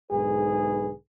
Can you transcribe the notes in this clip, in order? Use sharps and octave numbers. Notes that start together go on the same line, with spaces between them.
B1 G#2 D3 G#4 B4